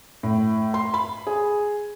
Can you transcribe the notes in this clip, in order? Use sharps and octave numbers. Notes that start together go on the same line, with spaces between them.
A2
C6
B5
G#4